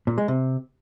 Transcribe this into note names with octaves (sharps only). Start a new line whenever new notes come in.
A#2
G#3
C3